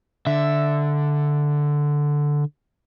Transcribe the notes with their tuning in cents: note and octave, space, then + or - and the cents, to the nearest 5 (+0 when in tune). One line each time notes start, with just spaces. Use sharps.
D3 +0 E5 +0